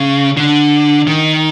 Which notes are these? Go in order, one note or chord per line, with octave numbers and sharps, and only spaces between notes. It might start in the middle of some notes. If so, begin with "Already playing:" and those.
Already playing: C#3
D3
D#3